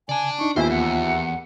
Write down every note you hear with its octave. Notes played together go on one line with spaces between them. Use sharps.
C#3 D5 G#5 A5
D4 D#4 C#6
D#2 B3 E4 F4 C5 E5 G#5
E2 F#5